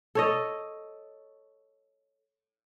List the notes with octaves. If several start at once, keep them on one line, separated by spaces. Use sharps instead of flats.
A4 C#5 D#5